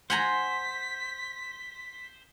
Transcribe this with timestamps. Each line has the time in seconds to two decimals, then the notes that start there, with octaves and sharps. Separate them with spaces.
0.10 C5 F#5 G#5 A#5 B6